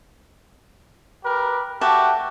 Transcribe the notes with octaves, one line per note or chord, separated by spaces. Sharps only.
G4 A#4 B4
A3 F#4 G4 E5 A5